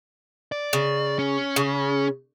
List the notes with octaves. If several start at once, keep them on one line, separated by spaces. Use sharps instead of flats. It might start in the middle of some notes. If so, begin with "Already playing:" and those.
D5
C#3
C#4
C#3